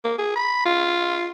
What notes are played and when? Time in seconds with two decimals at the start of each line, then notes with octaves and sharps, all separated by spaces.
0.04 A#3
0.18 G#4
0.36 B5
0.65 F4